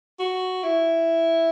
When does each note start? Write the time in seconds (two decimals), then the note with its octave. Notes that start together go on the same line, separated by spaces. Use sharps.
0.19 F#4
0.64 E4